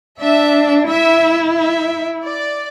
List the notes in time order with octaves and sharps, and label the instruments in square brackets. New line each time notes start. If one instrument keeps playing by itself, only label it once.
[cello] D4 [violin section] E5
[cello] E4 [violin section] E5
[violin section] E5
D5